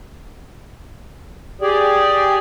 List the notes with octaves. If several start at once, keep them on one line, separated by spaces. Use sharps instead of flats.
G4 G#4 D5